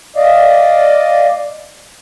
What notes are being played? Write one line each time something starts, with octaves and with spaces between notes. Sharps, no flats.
D5 D#5 F5